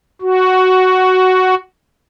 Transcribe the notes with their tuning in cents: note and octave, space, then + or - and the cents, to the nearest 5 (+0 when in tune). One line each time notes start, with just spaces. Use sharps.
F#4 +5